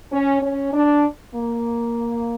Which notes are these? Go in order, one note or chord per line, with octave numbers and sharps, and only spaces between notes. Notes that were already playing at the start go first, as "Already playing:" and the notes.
C#4
C#4
D4
A#3